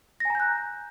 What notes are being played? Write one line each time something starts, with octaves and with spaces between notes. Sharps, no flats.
G#5 A#5 F#6 G6 A#6